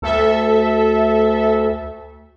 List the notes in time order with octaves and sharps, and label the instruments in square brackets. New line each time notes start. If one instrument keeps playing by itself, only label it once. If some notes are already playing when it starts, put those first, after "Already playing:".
[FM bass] D2 [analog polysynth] A4 E5